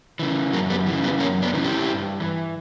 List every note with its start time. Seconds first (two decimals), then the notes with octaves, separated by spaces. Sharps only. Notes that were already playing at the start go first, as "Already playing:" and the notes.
0.19 C#3 E3
0.53 F#2 F#3 A#3
0.70 G3 B3
0.86 E3
0.91 C#3
1.04 G3 B3
1.19 F#2 A#3 C#4
1.42 B3 D4
1.54 C#3 E3
1.64 E4 G4
1.87 G2
2.20 E3